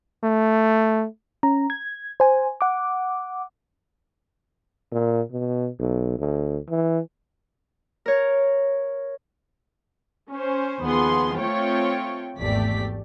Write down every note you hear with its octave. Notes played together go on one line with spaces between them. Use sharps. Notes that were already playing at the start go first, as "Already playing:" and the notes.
A3
C#4 A#5
G#6
C5 G#5
F#5 D6
A#2
B2
B1
D2
E3
A#4 C#5
C#4 C5
D#2 F3 B3 G#4 C6
A3 C4 F4 C#5 G5
G#1 E2 A3 G4 D5 B6